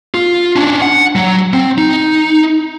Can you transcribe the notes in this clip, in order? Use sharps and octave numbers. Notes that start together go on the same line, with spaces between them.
F4
C#4 D4
F#5
F#3
C4
D#4